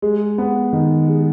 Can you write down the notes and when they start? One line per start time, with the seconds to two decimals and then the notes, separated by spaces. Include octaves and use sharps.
0.02 G#3
0.38 B3
0.73 D#3
1.08 G#3